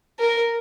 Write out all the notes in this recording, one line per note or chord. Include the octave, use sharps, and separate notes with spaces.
A#4